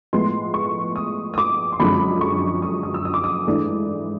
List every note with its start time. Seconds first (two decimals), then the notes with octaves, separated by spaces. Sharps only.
0.13 A2 F3 G#3 B3 C6
0.54 C#6
0.96 D#6
1.34 D#6
1.38 D6
1.73 C6
1.79 F#2 D3 F3 G#3 C4 B5
2.21 C#6
2.62 D#6
2.83 D#6
2.94 E6
3.05 D#6
3.14 D6
3.24 D#6
3.47 G#2 E3 A3 D4